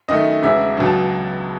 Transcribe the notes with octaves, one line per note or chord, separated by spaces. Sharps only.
F#2 D#3 A3 D#5
E1 E2 C#3 G#3 E5
C#2 B2 F#3
A5